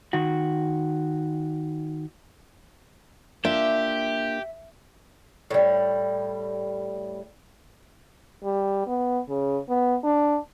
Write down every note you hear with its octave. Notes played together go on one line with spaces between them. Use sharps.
D#3 F#4
A#3 D4 F4 G4 E5
A2 G3
G3
B3
C#3
B3
D4